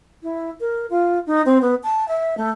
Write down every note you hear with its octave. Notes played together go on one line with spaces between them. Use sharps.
E4
A#4
F4
D#4
C4
B3
A5
E5
A3